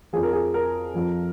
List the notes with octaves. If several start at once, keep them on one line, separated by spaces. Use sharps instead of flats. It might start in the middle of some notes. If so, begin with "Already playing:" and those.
F2 F3 G#4
A#4
G#4
A#4
F2 F3